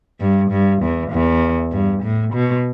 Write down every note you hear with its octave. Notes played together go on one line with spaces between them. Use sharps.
G2
G2
E2
E2
G2
A2
B2